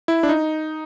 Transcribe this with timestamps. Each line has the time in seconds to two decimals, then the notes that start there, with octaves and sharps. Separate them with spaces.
0.08 E4
0.23 D4
0.29 D#4